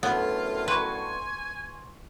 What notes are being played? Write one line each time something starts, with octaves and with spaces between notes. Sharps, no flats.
F#2 A2 D3 B3 F4
B4 G#5 C6 C#6